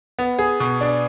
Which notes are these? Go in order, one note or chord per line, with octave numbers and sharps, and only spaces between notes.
B3
G#4
B2
D4